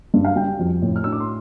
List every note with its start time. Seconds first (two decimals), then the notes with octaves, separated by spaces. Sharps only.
0.14 G2
0.25 F5
0.36 G3 G5
0.59 F2
0.82 A2
0.96 F6
1.04 D4 E6
1.12 D6
1.20 C6